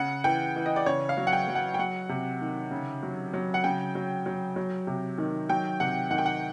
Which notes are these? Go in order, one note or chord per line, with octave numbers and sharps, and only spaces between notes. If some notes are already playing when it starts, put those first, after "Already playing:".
Already playing: C#3 F#5
E3 G5
E3
D#5
D5
C#3 C#5
F5
F#3
F#5
G5
F#3
F#5
G5
F#3 F#5
C3
D#3
C#3
F#3
F#3
F#5
C#3 G5
F#3
F#3
F#3
C3
D#3
F#3 G5
C3 F#5
D#3 F#5
G5
F#5